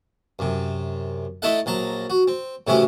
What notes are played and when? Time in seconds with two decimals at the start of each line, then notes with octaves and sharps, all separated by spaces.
0.39 F#2 C3
1.42 A3 D#4 E4 A4 E5 F#5
1.66 A#1 F#3 A5 A#5
2.10 F#4
2.28 C4
2.67 A2 C3 E3 C#4 E4 F#4